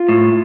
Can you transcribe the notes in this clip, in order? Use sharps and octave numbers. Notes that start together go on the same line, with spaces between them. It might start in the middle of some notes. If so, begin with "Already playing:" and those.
Already playing: F4
A2